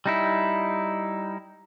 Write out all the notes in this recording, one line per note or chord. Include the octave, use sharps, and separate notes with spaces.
G3 D#4 E4